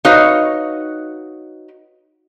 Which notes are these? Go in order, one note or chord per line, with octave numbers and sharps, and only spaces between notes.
D#4 F#4 B4 C#5 D#5 F5